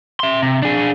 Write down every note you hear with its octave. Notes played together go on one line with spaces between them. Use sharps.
E5 C6
C3
D4 G#4